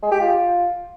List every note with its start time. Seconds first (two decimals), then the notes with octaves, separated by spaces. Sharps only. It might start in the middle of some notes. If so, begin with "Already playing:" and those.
0.03 G#3
0.11 G4
0.20 F4